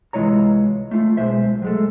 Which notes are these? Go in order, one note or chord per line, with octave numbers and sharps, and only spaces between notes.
C2 E3 G#3 F4 C#5 A#5
A3 F4
B1 G#3 C5 E5
F#3 G#3 A3